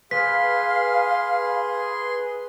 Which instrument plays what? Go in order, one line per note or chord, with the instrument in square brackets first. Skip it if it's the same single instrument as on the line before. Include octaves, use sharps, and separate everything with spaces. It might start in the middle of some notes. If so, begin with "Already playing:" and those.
[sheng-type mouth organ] G#4 C6 [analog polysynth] B4 [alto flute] F5 [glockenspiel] B6